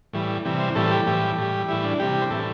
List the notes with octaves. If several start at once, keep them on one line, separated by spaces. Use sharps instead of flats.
A2 E3 G3
C3 E3 G3
C5
A2 E3 G3 A4
G4
A2 E3 G3
A2 G3
A2 E3 G3 E4
D4
C3 G3 G4
C5
A2 E3 G3 A4